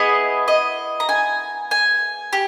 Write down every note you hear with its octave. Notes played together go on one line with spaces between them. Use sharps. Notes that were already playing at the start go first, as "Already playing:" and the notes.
Already playing: B3 E4 G#4 D#5
D#5
A#5
G#5
G#5
G4